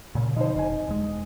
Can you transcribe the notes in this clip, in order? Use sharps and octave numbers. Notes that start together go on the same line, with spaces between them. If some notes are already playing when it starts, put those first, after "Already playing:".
A#2 C#3
B2 D3 F3 D#4 C5
F1 D#4 G#5
E1 G#3